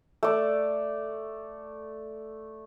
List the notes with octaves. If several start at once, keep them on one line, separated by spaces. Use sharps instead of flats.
A3 D5